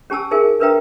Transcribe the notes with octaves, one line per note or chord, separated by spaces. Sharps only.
C#4 G4 G#5 A5 E6
D#4 G#4 A#4 E5 G#5
D4 A#4 B4 E5 G5 A#5